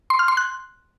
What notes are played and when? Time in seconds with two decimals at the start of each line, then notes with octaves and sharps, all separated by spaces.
0.10 C6
0.19 F6
0.28 C6
0.37 F#6